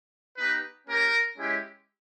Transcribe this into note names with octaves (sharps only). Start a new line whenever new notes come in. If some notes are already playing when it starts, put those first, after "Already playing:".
B3 D#4 G4 B4
A#3 C#4 G4 A#4
G#3 C#4 E4 G4